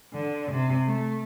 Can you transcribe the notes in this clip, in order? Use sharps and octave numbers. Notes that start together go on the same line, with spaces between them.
D3
C3
A3